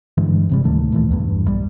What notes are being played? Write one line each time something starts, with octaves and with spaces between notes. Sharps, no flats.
G2 D3 E3 G#3
E1 C3 G3
D2 A2 D#3 A3
A#2 E3 A3
B1 E2 G2
G3